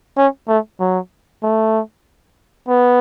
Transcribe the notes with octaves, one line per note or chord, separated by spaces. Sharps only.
C#4
A3
F#3
A3
B3